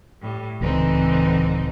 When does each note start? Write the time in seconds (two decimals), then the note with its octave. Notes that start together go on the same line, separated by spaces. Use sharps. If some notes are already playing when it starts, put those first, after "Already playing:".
0.22 A2 G3
0.61 D1 C#2 D3 E3 C4 D#4